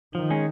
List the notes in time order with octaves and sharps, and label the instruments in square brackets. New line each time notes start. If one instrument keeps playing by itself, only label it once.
[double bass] D#3 [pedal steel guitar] F3
[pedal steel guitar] G#3 C#4